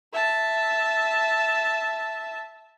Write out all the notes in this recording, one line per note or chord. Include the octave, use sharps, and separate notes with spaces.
E5 A5